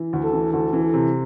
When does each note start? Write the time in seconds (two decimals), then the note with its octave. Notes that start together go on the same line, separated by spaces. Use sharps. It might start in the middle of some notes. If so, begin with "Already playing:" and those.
Already playing: E3
0.13 D2
0.23 A4
0.33 E3
0.53 D2 A4
0.73 E3
0.83 A4
0.93 C3